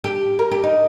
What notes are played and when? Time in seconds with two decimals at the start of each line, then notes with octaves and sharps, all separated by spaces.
0.04 G4
0.39 A#4
0.51 G4
0.64 D#4